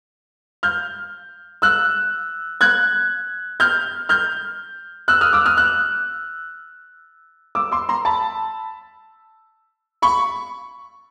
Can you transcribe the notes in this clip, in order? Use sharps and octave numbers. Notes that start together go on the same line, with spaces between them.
F6 G6
E6 F#6
F#6 G#6
F6 G6
F6 G6
E6 F#6
D#6 F6
D6 E6
D#6 F6
E6 F#6
D6 E6
C6 D6
A#5 C6
A5 B5
B5 C#6